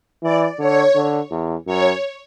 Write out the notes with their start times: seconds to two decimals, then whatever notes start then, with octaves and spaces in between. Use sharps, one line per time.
0.23 E3 D5
0.59 D3 C#5
0.95 D3
1.31 E2
1.66 F#2 C#5